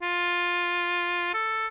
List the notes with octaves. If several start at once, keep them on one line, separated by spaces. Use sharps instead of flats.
F4
A4